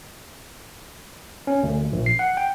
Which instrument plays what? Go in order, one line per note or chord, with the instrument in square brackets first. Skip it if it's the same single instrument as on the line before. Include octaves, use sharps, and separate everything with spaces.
[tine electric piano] C#4
D2
A#1
C7
F#5
G5